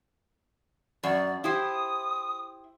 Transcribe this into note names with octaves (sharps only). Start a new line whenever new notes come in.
F#2 D5
E4 G4 C5 D#6